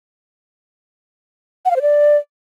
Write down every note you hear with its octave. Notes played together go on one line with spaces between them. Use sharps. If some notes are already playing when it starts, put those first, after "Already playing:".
F#5
F5
C5
D5